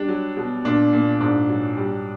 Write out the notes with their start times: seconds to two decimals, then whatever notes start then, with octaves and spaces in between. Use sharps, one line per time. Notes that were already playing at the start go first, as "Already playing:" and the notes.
Already playing: G3 D4
0.08 F#3
0.37 B2
0.65 A#2 D4
0.93 A#2
1.20 G#2 D4
1.49 F#3
1.77 G3